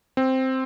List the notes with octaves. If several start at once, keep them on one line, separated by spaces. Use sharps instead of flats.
C4